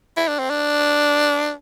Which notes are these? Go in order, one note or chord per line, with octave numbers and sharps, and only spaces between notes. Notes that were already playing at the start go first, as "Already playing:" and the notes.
E4
D4
C4
D4